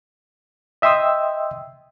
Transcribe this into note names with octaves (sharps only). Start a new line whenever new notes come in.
D#5 E5 G5 C6 D#6 E6